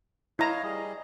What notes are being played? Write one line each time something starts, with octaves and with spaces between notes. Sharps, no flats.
E4 C#5 D#5 F5 A#5
G3 G#4 D#5